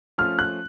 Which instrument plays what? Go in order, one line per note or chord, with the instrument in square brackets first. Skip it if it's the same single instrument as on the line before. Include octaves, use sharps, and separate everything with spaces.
[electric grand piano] F3 A3 C#4 F4 [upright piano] F6
[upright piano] F#6